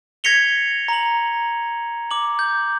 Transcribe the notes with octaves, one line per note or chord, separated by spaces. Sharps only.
G#6 A#6 B6 C#7 F7 G7
A#5 F#7
D6 F#7
G6